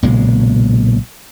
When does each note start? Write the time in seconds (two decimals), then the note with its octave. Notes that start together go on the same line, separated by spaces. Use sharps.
0.03 B1 A#2 C#3 G#3